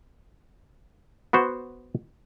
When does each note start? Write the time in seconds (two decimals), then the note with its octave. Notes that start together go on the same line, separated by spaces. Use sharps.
1.33 B3 F#4 C5